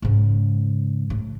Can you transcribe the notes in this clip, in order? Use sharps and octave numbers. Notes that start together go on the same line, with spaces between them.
G#2 C#3
A2